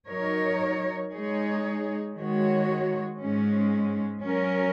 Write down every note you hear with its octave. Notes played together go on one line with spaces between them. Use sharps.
F#3 D#4 A#4 C#5
G#3 D#4 G#4 C#5
D#3 G#3 F#4 C#5
G#2 G#3 C#4
F#3 C#4 A#4